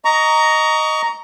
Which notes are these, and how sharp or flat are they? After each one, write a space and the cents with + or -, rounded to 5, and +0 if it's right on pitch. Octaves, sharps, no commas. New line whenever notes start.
D#5 +0 A#5 +0 C#6 +30